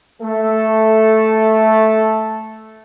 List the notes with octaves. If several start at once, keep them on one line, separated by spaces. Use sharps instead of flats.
A3 A4